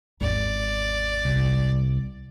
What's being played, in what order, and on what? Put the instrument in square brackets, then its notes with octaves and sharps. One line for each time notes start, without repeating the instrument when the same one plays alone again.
[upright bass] G#1 E2 [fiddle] D5
[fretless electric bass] C2